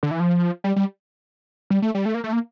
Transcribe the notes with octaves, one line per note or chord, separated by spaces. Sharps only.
D3
E3
F3
G3
G3
G3
A3
G3
A3
A#3
A3
A#3